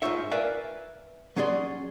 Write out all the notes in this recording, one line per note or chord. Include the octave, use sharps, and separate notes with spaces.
G#2 B2 F4 C5 C#5 E5
A#4 B4 D5 E5 F5 G#5
F#3 C#4 G#4 D5 C6